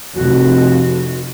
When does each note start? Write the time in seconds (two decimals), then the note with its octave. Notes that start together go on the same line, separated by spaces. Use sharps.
0.15 F1 F2 F#4